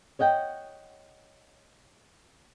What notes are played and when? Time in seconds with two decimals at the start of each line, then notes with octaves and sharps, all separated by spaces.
0.19 C#5 D#5 F#5 G5